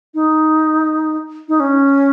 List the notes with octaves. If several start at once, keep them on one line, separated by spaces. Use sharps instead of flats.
D#4
D#4
C#4